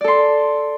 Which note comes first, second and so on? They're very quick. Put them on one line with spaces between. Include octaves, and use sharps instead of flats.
D5 A4 C6